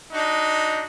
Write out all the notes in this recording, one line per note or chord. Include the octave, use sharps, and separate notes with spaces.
D4 D#4 F#4